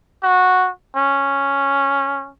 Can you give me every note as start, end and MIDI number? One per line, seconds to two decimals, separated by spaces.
0.23 0.69 66
0.96 2.29 61